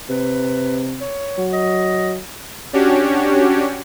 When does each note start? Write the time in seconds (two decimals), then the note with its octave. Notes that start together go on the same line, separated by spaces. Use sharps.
0.09 C3 B4
1.01 C#5
1.38 F#3
1.53 D#5
2.73 C#4 D4 F#4 G4 C#5